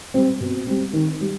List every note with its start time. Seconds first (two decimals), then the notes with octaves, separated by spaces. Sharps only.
0.14 G3 C4
0.41 B2
0.67 G3 C4
0.93 D#3
1.21 G3